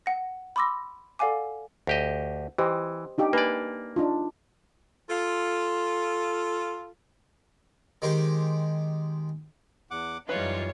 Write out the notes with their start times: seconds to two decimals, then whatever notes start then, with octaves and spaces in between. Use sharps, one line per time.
0.06 F#5 A#6
0.56 B5 C6 D6 E6 A#6
1.19 A4 D5 F5 F#5 G#5 D6
1.87 D2 G4 D#5
2.58 E3 G4 C5 D#5
3.18 D4 D#4 G4
3.33 A#3 B4 D5 G#5
3.96 D4 D#4 F4
5.09 F4 A4
8.02 D#3 G#3 G4 C5
9.91 E2 F#5 D6
10.29 F#2 E3 G3 D#4 F4 B4 C#5